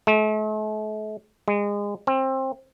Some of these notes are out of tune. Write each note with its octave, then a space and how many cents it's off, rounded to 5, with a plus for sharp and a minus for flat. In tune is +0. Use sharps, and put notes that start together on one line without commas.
A3 -45
G#3 -30
C4 +25